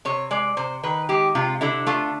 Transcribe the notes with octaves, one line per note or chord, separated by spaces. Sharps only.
C3 C#5
G#3 D5
C3 C5
D#3 B4
G#3 G4
C3 F4
D3 E4
A3 F4